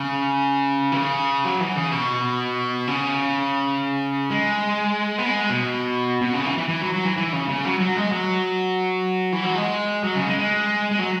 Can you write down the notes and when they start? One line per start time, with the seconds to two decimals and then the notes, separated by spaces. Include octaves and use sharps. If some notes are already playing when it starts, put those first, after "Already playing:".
Already playing: C#3
0.92 E3
0.96 C#3
1.44 F#3
1.60 E3
1.76 C#3
1.92 B2
2.87 C#3
4.31 G#3
5.18 B3
5.26 G#3
5.50 B2
6.21 B2
6.34 C#3
6.46 E3
6.58 E3
6.69 E3
6.81 F#3
6.93 F#3
7.05 E3
7.17 E3
7.33 C#3
7.49 C#3
7.65 F#3
7.80 F#3
7.97 G#3
8.12 F#3
9.32 E3
9.44 F#3
9.55 G#3
10.04 F#3
10.15 C#3
10.27 G#3
10.39 G#3
10.91 G#3
10.99 F#3